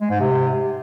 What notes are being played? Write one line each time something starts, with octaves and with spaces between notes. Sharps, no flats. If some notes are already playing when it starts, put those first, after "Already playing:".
G#3
G#2
C3